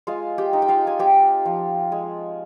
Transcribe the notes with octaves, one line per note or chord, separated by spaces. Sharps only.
G#3 F4 F5
G4 G5
D#4
G5
F4 F5
G#5
C4 G4 G5
F3
G#3